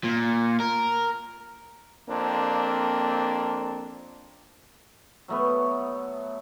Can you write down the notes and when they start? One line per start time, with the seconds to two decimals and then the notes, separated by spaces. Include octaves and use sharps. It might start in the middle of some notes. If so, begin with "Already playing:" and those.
0.04 A#2
0.60 A#4
2.09 F2 A#3 C4 D4
5.28 F#3 A3 B3